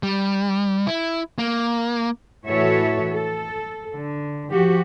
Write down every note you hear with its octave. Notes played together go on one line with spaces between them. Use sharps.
G3
E4
A#3
A2 E3 F#4 A4 C#5 E5
A4
D3
F3 F#4 G4